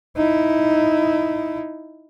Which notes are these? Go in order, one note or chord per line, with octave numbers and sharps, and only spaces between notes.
D#4 E4